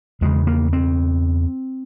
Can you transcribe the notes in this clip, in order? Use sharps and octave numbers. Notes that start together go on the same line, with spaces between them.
E2 C#3 G#3
A#3
C4